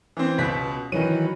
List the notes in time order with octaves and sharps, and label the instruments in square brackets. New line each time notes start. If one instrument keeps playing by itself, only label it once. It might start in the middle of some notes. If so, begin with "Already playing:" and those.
[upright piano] E3 C4
C#2 B2 B6
[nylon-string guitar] D#3 E3 F#3 [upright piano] D#7